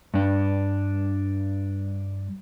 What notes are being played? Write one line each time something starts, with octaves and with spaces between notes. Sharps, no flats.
G2 D4